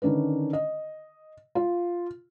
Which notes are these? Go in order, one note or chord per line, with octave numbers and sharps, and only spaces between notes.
D3 D#3 C#4 D4 B4
D#5
F4